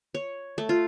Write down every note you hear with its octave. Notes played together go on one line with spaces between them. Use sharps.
C#5
A3
F4